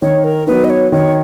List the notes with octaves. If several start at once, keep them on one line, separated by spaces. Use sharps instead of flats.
D#3 C#5
A#4
F#3 B3 D#4 B4
D#5
C#5
D#3 C#5